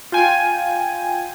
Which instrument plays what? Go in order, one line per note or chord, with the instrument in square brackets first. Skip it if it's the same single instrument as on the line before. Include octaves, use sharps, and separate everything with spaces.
[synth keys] F4 G5 G#5